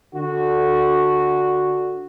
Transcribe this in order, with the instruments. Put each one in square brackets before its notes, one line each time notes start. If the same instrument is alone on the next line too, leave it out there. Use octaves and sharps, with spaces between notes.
[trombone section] D3 F#4